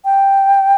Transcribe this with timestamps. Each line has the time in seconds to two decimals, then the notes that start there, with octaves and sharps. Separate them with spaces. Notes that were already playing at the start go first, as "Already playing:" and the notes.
0.05 G5